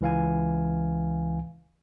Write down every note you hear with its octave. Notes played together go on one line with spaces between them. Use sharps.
C#2 E3 F5 G#5